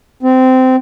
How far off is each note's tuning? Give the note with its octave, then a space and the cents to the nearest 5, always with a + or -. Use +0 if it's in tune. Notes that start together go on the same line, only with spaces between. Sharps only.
C4 -20